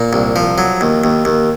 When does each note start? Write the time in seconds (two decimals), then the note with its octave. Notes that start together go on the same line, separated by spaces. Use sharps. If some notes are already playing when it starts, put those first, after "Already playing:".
Already playing: A#2
0.13 C2
0.36 F3
0.58 F#3
0.81 D#2
1.04 D#2
1.25 D#2